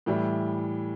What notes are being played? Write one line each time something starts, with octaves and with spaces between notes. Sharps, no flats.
A2 E3 G3